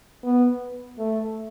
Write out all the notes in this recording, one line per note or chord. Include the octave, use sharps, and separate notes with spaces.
B3
A3